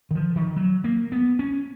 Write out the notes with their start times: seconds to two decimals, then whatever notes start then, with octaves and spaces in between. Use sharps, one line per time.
0.11 D#3
0.15 F3
0.36 D#3
0.56 F#3
0.84 A#3
1.12 B3
1.39 C#4